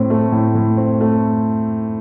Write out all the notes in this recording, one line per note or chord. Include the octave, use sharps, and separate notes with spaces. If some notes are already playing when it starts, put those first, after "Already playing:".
Already playing: A2 C4
A3
A2
A2
C4
A3